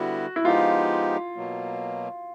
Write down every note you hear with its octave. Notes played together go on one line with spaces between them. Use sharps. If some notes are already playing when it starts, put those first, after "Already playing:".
Already playing: D3 G3 B3 E4 F#4
E4
F3 G#3 B3 D#4 F4 G4
B2 F#3 A#3